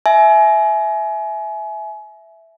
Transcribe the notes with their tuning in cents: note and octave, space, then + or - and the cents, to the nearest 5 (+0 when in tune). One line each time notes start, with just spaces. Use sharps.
E5 +0 G#5 +30